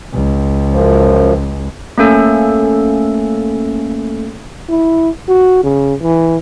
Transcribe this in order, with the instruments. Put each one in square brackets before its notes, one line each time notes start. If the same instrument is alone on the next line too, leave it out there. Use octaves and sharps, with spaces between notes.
[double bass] C#2
[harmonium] F#2 F3
[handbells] A3 A#3 C#4 A4
[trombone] E4
F#4
C#3
E3